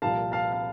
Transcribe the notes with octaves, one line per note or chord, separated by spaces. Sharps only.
C2 A#2 F3 F5 A5
F5 A5
F5